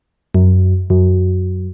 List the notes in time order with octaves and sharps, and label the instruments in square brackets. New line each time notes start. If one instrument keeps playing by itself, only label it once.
[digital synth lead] F#2
F#2